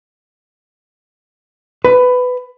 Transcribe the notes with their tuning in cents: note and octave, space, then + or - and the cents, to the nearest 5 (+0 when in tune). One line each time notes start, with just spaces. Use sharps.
B4 +15